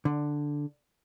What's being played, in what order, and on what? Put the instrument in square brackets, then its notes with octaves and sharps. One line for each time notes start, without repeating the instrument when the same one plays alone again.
[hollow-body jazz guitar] D3